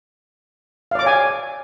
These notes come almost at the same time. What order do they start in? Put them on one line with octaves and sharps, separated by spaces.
F5 D5 D6 C#5 G#5